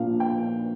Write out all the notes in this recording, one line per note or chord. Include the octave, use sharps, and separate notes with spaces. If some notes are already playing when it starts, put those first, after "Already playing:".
Already playing: A#1 A#2 F3 A#3 D4 F5
G5